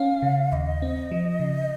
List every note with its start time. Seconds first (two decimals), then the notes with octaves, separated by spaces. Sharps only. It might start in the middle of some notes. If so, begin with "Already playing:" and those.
Already playing: C#4 F5
0.22 C#3
0.52 D#2 D#5
0.82 C4
1.11 F3
1.40 C#3